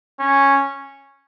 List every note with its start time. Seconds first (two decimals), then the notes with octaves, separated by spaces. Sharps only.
0.19 C#4